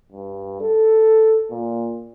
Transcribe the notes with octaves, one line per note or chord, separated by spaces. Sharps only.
G2
A4
A#2